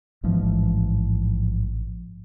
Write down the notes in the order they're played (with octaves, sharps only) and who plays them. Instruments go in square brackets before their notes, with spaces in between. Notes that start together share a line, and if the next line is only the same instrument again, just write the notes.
[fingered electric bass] A1 G#2 E3 F3